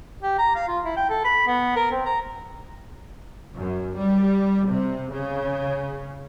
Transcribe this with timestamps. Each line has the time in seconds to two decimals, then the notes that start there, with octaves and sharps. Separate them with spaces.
0.22 G4
0.38 A#5
0.56 F5
0.68 F4
0.84 E4
0.96 G5
1.10 A4
1.24 B5
1.47 B3
1.76 A#4
1.91 C4
2.06 A#5
3.57 F#2
3.97 G3
4.69 C3
5.11 C#3